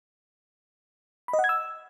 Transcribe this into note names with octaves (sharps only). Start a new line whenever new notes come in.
B5
D#5
F#5
G#6
E6